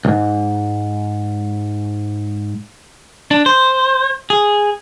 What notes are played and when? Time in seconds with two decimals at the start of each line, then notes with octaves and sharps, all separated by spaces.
0.05 C#2 G#2
3.31 D4
3.46 C5
4.30 G#4